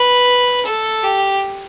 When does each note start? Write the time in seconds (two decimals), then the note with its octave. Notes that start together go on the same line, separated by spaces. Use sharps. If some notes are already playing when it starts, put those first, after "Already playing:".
Already playing: B4
0.66 A4
1.03 G4